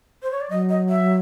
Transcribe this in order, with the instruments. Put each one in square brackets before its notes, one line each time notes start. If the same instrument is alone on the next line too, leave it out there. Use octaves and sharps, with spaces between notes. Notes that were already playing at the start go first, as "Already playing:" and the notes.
[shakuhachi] C5
C#5
D5
[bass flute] F#3 [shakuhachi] D#5
[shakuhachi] D#5
E5